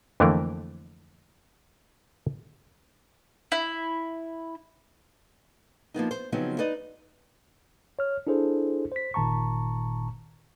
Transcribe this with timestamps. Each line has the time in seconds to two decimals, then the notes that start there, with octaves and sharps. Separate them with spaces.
0.20 F2 D3 E3 A3 A#3 A#4
3.52 E4
5.94 F3 A#3 B3 D#4
6.11 C5
6.32 C#3 F3 F#3 B3 C4 D#4
6.59 D#4 B4 D5 D#5
7.99 C#5 F6
8.27 D4 E4 G#4 A4 C5
8.92 C5 B6
9.14 G1 A#2 D#3 A5 A#5 C#6